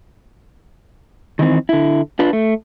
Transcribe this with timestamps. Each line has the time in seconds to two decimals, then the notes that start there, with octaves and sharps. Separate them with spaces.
1.39 D#3 E3 C4
1.69 D3 E4
2.19 D4 F4 B4
2.33 A3